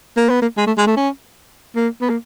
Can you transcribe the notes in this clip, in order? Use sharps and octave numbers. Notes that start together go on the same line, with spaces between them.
A#3
B3
A#3
G#3
A3
G#3
A3
C#4
A#3
B3
A#3